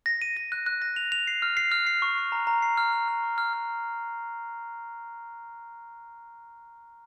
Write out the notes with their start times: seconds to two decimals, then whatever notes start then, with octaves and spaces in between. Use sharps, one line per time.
0.06 A#6
0.22 D#7
0.37 A#6
0.52 F#6
0.66 F#6
0.82 A#6
0.96 F7
1.12 F7
1.27 C7
1.42 F6
1.57 C7
1.72 F6
1.87 C7
2.02 C#6
2.18 C7
2.32 A#5
2.47 A#5
2.62 C7
2.78 F6
2.92 F6
3.08 F6
3.23 C#6
3.38 F6
3.53 F6